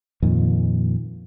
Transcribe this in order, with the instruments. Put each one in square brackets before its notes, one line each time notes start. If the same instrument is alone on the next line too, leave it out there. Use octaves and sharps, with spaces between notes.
[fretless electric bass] F2 A#2 D#3